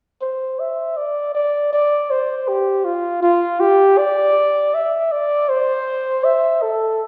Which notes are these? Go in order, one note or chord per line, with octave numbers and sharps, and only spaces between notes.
C5
E5
D5
D5
D5
C5
G4
F4
F4
G4
D5
E5
D5
C5
E5
A4